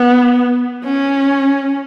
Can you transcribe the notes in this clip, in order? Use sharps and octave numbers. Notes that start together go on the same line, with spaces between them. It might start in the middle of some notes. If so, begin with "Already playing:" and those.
Already playing: B3
C#4